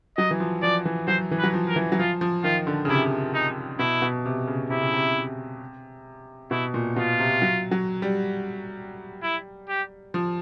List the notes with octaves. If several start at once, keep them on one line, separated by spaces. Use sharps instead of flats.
F#3 D#5
E3
F3
F3 D5
E3
F#3 C5
E3
B4
F#3
F3
A#4
E3
F#3
F3 F4
F3
D#3 F4
D3
C#3
C3 E4
D#4
B2 E4
B2
C3
C#3
C3 E4
C#3
C3
B2 E4
A#2
B2 F4
C3
F#3
F#3
G3
E4
G4
F3